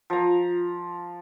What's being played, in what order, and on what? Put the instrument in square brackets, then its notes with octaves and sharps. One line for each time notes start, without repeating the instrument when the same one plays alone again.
[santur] F3 A#5